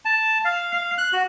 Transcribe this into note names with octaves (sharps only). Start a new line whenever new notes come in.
A5
F5
F5
F#6
F#4